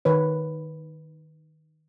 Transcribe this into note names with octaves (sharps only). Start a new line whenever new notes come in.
D#3 B4 C#5